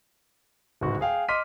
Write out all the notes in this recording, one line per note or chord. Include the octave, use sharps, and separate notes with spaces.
D1 C#2 G#2 F#4
G#4 F5 G5
D#5 C6 D6 F6 B6 D#7